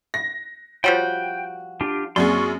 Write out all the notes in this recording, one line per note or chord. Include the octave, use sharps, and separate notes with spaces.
A#6
F3 G3 F#4 C#5 G5
D4 F4 G4
F#2 A#3 C4 G#4 D5 C6 C#6